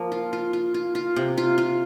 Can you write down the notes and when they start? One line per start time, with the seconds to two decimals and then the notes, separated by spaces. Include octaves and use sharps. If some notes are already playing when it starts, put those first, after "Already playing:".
Already playing: F3 A#3
0.12 F4
0.33 F4
0.53 F4
0.74 F4
0.95 F4
1.16 C3
1.38 F4
1.58 F4